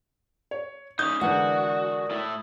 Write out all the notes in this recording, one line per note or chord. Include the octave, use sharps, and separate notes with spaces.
C#5
C#4 D#4 D#6 G6
D3 E3 G#3 F#4 A#4 D5 F#5
A2 E4 A4